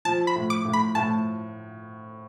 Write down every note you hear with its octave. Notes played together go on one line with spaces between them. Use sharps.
F3 A5
B5
A2
D6
A2
B5
A2 A5